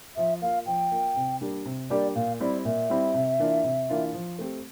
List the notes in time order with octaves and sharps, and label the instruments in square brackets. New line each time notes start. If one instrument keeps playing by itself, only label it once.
[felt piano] F3 [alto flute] E5
[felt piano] A#3 F4 [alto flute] F5
[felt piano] F3 [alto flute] G5
[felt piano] A#3 F4
C3
G3 A#3 D4 G4
C3
[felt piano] G3 A#3 D4 G4 [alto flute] D5
[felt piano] A#2 [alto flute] F5
[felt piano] G3 C4 E4 [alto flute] D5
[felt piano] A#2 [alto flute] E5
[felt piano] G3 C4 E4
C3
E3 A#3 D4 F4
C3
E3 A#3 D4 F4
F3
A3 C4 G4